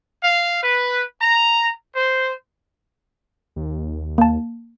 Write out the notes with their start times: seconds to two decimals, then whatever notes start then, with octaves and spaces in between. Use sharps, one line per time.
0.23 F5
0.62 B4
1.21 A#5
1.94 C5
3.56 D#2
4.18 A#3 A5